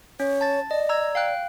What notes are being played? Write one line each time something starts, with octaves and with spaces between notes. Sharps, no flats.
C#4 C#5
A5 A6
D5 D#5
A#5 E6 G#6
F5 G5 F#6